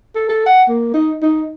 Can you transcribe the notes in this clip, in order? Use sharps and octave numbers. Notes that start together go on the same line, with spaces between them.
A4
A4
F#5
A#3
D#4
D#4